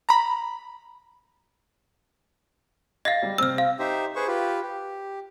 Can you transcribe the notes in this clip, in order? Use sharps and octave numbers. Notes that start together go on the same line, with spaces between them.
A#5 B5
D#5 F5 A6 A#6 C7
G3
C3 C4 E6 F6
F5
D#4 G4 C5 E5
G#4 B4 C5 C#6
F4 G4 B4
G4